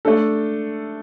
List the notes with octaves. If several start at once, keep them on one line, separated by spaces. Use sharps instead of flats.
A3 D4 A4